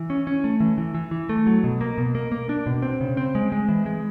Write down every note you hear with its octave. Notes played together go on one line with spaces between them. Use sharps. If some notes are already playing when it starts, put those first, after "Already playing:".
Already playing: E3
C#4
C#4
A3
E3
E3
E3
E3
A3
F#3
B2
A#3
B2
A#3
A#3
D4
B2
C4
C#3
C4
G#3
G#3
E3
G#3